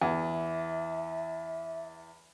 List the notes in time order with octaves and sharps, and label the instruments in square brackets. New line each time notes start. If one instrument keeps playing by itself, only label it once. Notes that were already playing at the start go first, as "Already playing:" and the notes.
[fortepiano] E2 [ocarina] E5